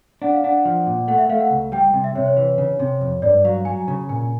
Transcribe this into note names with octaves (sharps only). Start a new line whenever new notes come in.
D4 F#5
F5
D4 F#5
F3
A#2
A3 F#5
E5
A3 F5
F#5
C#2
G3 G5
C3
E5
C3 C#5
C#5
E3
C#3
C3
F2
G2 D5
F#3 F5
F#3 G#5
C#3
A#2 G#5